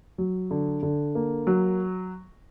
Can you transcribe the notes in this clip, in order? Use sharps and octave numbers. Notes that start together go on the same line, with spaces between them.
F#3
D3
D3
A#3
F#3